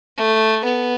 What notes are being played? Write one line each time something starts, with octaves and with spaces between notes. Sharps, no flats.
A3
B3